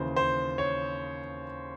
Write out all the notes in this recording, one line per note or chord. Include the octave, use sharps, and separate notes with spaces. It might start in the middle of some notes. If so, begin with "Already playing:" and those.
Already playing: D#2 C#3 E3 C5
C5
C#5